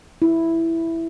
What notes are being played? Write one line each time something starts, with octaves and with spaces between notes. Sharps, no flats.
E4